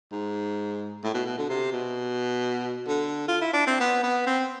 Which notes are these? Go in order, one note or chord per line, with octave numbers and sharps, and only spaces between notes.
G#2
A2
B2
B2
D3
C3
B2
D3
F4
E4
D4
C4
B3
B3
C4